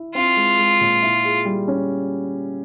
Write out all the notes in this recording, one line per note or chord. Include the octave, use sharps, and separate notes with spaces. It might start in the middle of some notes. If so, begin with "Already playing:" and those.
Already playing: E4
C4 F4
G#3
G#3
A#2
E4
G#4
G3
C#4